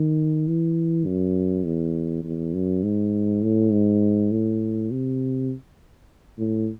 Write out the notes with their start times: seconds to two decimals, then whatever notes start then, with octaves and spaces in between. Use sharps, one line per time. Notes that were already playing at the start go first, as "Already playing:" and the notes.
Already playing: D#3
0.47 E3
1.06 F#2
1.65 E2
2.24 E2
2.54 F#2
2.83 G#2
3.43 A2
3.72 G#2
4.31 A2
4.91 C3
6.38 A2